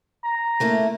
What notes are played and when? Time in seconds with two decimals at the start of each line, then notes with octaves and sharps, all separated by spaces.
0.25 A#5
0.60 A3 A#3 E4